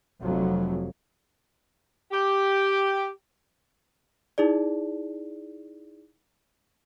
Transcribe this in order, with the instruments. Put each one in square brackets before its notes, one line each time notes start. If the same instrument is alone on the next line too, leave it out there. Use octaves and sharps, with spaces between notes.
[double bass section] F1 F2 F#3
[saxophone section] G4
[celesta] D#4 E4 G#4 D5